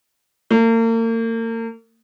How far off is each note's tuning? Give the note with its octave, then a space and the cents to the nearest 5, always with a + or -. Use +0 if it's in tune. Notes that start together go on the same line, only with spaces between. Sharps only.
A#3 -40